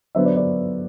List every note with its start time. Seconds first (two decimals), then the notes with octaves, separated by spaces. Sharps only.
0.15 D3 F#3 B3 C5 E5
0.25 B4 D5
0.37 B4 D5